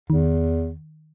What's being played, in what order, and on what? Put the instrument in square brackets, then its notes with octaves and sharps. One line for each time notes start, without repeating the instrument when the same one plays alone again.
[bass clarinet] E2 [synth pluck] D#3